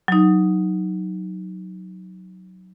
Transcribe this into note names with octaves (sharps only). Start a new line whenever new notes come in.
F#3 D#4